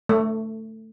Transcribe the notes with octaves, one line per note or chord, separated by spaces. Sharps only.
A3